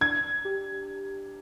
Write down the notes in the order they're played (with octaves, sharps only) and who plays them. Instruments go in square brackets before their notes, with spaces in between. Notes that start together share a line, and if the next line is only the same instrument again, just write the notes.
[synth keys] D4 [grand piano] G#6
[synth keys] G4